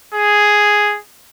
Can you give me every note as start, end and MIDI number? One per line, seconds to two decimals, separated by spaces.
0.14 0.98 68